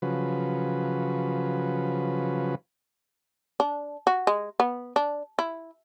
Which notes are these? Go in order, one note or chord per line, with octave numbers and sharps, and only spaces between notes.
C#3 F3 F#3 B4
D4
F#4
G#3
B3
D4
E4